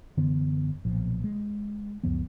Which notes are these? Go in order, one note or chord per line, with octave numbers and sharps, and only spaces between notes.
F#2 D3 E3 B3
B1 A#2 F3
G#3
C#2 F#2 F3 B3